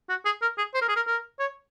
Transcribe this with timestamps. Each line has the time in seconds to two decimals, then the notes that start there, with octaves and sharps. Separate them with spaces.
0.09 F#4
0.25 G#4
0.42 A#4
0.58 G#4
0.74 C5
0.81 A#4
0.88 G#4
0.96 A#4
1.07 A#4
1.39 C#5